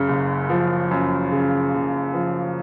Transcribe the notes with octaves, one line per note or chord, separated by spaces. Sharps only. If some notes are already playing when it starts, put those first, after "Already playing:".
Already playing: F#2 C#3
F#1
F3
F#2
C#3
F#1
F3